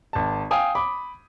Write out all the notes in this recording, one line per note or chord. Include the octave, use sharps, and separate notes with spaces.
G#1 A5
F5 G5 G#5 D#6
B5 D6